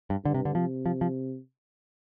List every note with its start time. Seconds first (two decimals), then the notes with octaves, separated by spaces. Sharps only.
0.10 G2
0.24 G2 D3
0.34 C3
0.45 D3
0.55 C3 F3
0.86 F3
1.01 F3